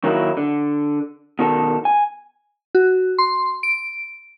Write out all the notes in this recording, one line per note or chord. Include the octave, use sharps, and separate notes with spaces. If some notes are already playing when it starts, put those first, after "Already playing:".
D#3 F#3 A#3 D#4 E4
D3
B2 D#3 A4
G#5
F#4
C6
D7